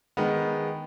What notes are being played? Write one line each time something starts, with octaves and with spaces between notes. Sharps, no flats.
D#3 G#3 B3